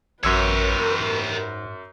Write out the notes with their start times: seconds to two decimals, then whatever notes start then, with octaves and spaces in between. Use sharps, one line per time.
0.23 A1 F#2 G4 A#4 B4 C#5 E6 G#6
1.00 G#2